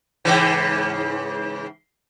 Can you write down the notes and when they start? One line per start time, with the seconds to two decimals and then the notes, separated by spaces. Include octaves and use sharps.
0.25 G#2 C#3 E3